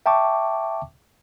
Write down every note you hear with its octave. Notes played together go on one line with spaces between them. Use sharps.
E5 G5 A5 C#6 D6